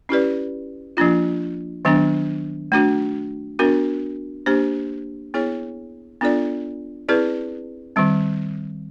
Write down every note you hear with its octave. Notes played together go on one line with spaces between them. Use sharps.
C#4 E4 G4 B4 D5
F3 A#3 D4 F4
D#3 F#3 B3 D4
A3 D4 F#4
B3 D4 F#4 A#4
A#3 D4 G4 C5
B3 E4 G#4 C#5
B3 D4 F4 A4 D5
C4 E4 G#4 B4 D5
D#3 G3 C4